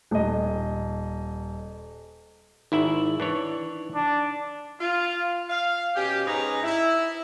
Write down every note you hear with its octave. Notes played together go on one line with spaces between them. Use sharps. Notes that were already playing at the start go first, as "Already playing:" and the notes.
D#1 D#5
G#1 D#4 E4 E5 F#7
E3 D4 C#5
D4
F4
F5
B2 C#4 G4
G#2 C#4 D#4 B4 A#5
E4